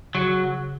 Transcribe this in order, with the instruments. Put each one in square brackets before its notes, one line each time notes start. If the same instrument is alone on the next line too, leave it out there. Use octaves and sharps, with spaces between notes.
[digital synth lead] C#3 [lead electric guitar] F#3